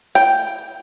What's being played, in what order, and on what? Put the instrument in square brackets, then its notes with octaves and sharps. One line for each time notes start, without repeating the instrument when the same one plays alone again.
[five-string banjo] G5